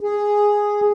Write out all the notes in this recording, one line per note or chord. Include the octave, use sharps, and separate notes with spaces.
G#4